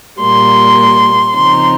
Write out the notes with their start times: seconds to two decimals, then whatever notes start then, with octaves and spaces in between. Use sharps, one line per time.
0.20 A#2 G3 A#3 C6
1.36 C#3 F3 C4 D#4 C6